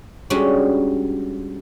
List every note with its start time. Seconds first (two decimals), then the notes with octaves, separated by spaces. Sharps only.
0.30 G3 G#3 C#4 D4 F#4